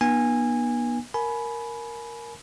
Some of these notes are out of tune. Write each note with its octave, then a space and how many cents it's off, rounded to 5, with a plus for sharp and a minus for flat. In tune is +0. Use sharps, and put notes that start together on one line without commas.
B3 -40 D#4 -45 G#5 -20
A#4 +0 G#5 +25 B5 +0